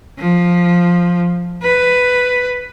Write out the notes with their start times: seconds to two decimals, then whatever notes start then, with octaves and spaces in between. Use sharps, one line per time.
0.18 F3
1.63 B4